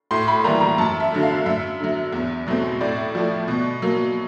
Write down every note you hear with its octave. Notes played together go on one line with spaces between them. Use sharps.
A2 C6
B5
E3 G3 A#3 A#5
A#5
F#2 A5
E5
D3 F#3 A3
F5
F#2 E5
D3 F#3
E2
B2 F#3 A3 C4
A2 D5
F3 A3
B2
F#3 A#3